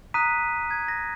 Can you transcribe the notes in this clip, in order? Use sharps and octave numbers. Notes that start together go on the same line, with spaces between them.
A#5 D#6 F#6 B6 D#7
G#6
A#6